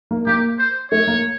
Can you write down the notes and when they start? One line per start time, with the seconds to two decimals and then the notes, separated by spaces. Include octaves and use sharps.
0.11 A#3
0.26 A#3 G4
0.59 C5
0.92 A3 C#5
1.07 A#3